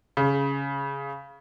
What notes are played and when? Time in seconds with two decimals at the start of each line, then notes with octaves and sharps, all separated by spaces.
0.17 C#3